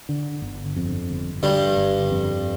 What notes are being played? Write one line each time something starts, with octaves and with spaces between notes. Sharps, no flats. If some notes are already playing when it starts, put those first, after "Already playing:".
D3
G1
F2
G1
G2 D3 G3
G1
F2